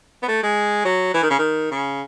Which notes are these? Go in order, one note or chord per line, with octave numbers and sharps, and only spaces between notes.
B3
A3
G#3
F#3
E3
D#3
C#3
D#3
C#3